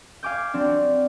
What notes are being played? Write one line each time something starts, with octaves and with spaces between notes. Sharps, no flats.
F5 G#5 D6 G6
F#3 C4 D4